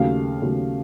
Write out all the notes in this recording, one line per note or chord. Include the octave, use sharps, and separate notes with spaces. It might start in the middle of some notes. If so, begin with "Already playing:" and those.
Already playing: D#2 C#3 F#3 A3 F5
D#2 C#3 F#3 A3